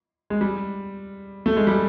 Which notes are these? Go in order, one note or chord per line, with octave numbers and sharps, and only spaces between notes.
G#3
G3
A3
G#3
G3